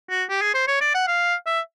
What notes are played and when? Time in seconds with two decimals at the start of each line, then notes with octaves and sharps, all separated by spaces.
0.10 F#4
0.30 G4
0.41 G#4
0.54 C5
0.68 C#5
0.81 D5
0.94 F#5
1.07 F5
1.46 E5